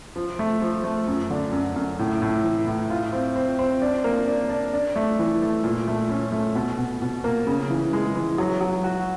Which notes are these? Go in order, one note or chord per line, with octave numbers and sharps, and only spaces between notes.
F3
A3
F3
A3
F#2
D3
F#2
F#2
A2
A2
E3
A2
F4
C4
C4
C4
D4
A#3
D4
D4
D4
A3
E3
A3
A#2
A3
C#4
A3
B2
B2
B2
A#3
C#3
E3
G#3
E3
F#3
F#3
F#4